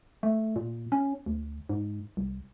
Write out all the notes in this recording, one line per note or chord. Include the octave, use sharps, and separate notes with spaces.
A3
A#2
C#4
D2
G#2
C2